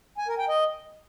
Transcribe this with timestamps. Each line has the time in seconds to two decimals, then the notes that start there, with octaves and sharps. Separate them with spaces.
0.18 G#5
0.28 A#4
0.38 G5
0.49 D#5